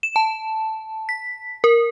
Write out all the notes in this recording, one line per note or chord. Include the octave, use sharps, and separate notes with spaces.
E7
A5
B6
A#4